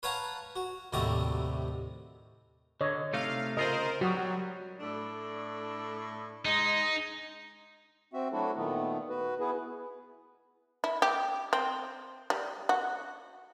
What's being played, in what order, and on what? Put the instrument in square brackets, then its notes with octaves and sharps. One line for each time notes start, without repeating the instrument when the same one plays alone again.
[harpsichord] B4 C#5 F5 F#5 A5 A#5
F#4
D#2 A2 C3 F#4 D5 A#5
[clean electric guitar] D3 [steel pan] C#5 D#5
[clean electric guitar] C3 A3 D#4 [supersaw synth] F5
[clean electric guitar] C#3 F4 G#4 [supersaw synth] A#4 C5 [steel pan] D#5
[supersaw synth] F#3 [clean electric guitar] G3 [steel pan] F#4 D#6
[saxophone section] A2 D4 A4
[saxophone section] G#3 G#4 D#5 [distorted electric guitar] D#4
[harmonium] C4 F#4 E5
F#3 A3 D4 E4 F#4 A4
A#2 D#3 A3 B3
F#4 B4
B3 E4 G#4 B4
[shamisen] E4
G4
C4
G3
F#4